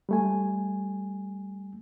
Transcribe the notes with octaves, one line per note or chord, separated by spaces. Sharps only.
G3 A3 G#5